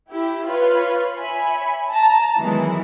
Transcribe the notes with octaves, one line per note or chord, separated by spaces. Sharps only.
E4 G4
F4 B4 C#5
C#5 E5 G#5 B5
A5 A#5
D#3 E3 F#3 G#3 B3 E4